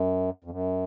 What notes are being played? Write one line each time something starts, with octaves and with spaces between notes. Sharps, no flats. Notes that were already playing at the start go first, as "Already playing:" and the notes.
Already playing: F#2
F2
F#2